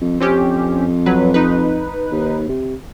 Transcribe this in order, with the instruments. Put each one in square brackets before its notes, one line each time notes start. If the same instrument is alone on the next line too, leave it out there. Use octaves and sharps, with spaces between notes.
[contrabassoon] F2
[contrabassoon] F2 [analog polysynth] C4 C#4 G4
[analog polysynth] F#3 B4
D#4 B4
[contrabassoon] D#2
C3